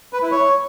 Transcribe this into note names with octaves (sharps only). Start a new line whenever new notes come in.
B4
E4
C#5